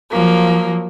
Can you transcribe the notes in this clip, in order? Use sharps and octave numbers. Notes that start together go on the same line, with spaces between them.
F3 F#3 A#3